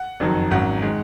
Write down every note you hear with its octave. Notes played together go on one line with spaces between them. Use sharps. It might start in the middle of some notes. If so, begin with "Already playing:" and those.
Already playing: F#5
F#1 F2 D#3 F#3
G#1 G#2 F#3 C#4 F#5
D#3 G#3